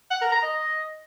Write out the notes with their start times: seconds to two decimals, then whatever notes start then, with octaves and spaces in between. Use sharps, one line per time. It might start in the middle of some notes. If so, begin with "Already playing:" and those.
0.11 F#5
0.21 A#4
0.32 A#5
0.43 D#5